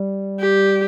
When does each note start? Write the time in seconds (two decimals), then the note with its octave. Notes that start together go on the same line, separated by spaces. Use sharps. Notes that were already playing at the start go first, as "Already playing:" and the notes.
Already playing: G3
0.40 G4